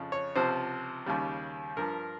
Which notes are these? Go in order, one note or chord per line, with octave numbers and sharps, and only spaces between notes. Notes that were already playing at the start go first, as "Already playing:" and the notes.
Already playing: F2 C#3 F3
C#5
C#2 C3 F3 C5
D#2 C#3 G3
G2 F3 A#4